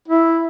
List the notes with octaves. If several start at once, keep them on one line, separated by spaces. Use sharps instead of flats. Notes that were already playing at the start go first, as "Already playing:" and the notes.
E4